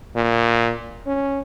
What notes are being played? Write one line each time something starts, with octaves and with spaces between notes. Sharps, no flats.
A#2
C#4